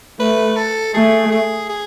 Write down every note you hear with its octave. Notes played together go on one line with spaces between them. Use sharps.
A3 B4
A4
A3 G#4
G#4
G#4